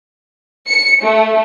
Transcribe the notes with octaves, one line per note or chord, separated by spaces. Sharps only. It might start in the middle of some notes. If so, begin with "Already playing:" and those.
C#7
A3